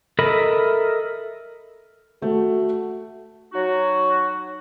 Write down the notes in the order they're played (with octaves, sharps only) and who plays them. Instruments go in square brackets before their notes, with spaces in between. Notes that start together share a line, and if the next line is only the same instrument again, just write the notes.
[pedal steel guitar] A4 A#4 D#5 E5 B5
[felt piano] A3 [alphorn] F#4
[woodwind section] F#3 D#4 F#4